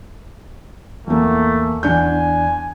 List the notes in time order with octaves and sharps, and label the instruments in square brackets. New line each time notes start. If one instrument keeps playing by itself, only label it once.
[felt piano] E2 A#3 [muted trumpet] A3
[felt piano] E2 D4 G6 [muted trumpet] G#5